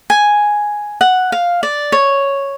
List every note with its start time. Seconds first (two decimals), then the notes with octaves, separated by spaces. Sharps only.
0.10 G#5
1.01 F#5
1.32 F5
1.63 D5
1.92 C#5